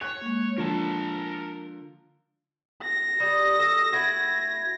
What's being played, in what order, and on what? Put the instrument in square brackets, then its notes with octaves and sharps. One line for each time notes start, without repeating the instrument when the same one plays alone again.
[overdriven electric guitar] C#5 [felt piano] F#6
[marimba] G#3 A#3
[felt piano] D3 F3 [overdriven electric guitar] A#4 A5
[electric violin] A#6
[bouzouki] G3 [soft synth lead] D#6
[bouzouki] A4
[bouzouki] A3 E4 F#4 [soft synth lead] G#6